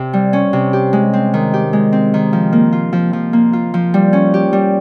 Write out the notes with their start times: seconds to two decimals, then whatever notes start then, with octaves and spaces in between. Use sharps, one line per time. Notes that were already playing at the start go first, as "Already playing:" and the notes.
Already playing: C3
0.13 G3
0.33 C#4
0.53 C3
0.73 G4
0.93 G#3
1.13 C4
1.34 D#3
1.54 G4
1.73 G#3
1.93 C4
2.14 D#3
2.33 F3
2.53 A#3
2.73 F4
2.93 F3
3.13 F3
3.33 A#3
3.53 F4
3.74 F3
3.94 G3
4.13 C#4
4.34 G4
4.53 G3